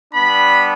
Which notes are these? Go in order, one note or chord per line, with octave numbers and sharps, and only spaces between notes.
G3 B3 D4 B5